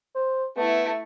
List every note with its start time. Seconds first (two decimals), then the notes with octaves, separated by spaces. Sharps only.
0.15 C5
0.57 A3 B3 E4